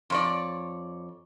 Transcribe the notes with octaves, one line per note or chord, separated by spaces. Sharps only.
F2 C#5 D5